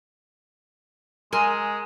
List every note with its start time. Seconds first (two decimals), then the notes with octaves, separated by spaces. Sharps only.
1.33 G#3 A#4 G#5 C6 E6